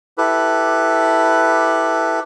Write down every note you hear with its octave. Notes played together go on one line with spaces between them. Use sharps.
E4 G4 A4 B4